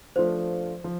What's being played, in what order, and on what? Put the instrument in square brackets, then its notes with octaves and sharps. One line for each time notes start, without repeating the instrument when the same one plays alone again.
[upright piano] F3 A3 D4 F4 [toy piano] C5
[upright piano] F3